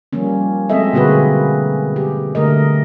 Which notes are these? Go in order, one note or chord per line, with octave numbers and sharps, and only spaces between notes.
F3 G3 A#3 C#4
F#3 G#3 C4 A4 D#5 E5
B2 D3 A#3 F#4 G#4 B4
G4
D3 A3 A#4 D#5